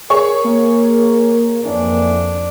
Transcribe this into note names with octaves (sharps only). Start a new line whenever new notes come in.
G#4 A#4 C#5 C#6
A#3
F2 E3 D4